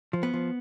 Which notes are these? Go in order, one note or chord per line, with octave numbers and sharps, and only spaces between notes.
F3
B3
F3